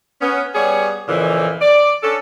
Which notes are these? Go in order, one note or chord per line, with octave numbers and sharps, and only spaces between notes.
B3 C#4
G3 B3 G#4 C#5
F2 A#2 C#3 E3
D5
C#4 D4 A4